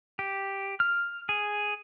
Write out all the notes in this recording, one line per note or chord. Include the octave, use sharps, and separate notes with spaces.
G4
F6
G#4